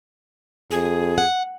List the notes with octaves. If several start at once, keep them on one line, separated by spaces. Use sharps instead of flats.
F2 G#4
F#5